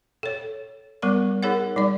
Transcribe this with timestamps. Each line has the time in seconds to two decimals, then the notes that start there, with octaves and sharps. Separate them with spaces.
0.23 A4 C#5
1.02 G3 B3 A#4 C#6
1.43 D#4 G#4 A#4 C#5 F#5
1.76 G3 D#4 D5